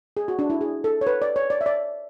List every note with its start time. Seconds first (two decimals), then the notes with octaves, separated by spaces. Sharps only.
0.17 G#4
0.28 F#4
0.39 D4
0.50 E4
0.61 G#4
0.84 A4
1.01 C#5
1.07 B4
1.22 D5
1.36 C#5
1.50 D5
1.61 E5
1.66 D5